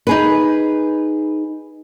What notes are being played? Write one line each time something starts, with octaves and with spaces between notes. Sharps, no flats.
D#4 G#4 B4